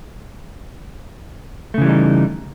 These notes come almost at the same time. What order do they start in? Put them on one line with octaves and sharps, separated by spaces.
A3 C#3 E3 G3 D#4